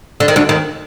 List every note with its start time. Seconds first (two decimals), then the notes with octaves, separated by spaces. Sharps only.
0.20 D3
0.28 D#3
0.36 D2 D3
0.49 D#2 D#3